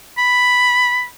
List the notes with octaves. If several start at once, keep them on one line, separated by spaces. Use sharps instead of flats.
B5